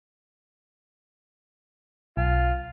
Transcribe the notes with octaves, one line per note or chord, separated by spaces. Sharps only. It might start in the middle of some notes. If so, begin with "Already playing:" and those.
B1 F4